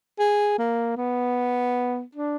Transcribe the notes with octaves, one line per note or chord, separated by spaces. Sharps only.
G#4
A#3
B3
D4